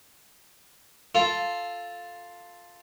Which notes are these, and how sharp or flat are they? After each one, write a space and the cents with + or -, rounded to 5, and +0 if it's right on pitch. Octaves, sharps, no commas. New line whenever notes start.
F4 +0 A4 +0